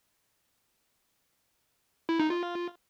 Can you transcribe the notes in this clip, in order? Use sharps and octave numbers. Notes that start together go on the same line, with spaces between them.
E4
D#4
F4